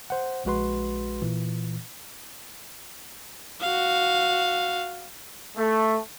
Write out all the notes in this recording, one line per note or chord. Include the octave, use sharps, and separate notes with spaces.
C5 F#5
A#1 G#3 F#4 B4 C6
A#2 E3
F#4 F5
A3